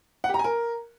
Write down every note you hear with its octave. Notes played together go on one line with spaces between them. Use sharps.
F#5
G4
A#5
G#5
A#4